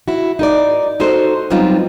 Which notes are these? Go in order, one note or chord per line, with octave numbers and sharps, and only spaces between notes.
E4 F#4
D#4 A#4 D5
D#4 F#4 A4 C5
F#3 G3 B3 C4 D#4 F4